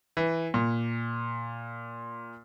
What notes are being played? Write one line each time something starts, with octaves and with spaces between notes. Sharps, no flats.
E3
A#2